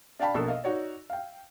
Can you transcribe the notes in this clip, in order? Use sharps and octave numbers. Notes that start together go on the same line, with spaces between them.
D4 D5 F5 G5 A5 B5
A#1 B2 A#3 A4 E6
D#5 F5
D#4 F#4 C#5 D5
F5 G5